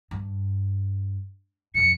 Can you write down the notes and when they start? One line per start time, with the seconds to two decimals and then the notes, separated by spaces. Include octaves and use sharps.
0.11 G2
1.74 F2 B2 C#7